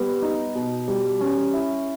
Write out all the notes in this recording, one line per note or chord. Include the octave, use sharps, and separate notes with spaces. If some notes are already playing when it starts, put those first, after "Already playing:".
Already playing: G3 B3
D#4
B2
G3
C#4
E4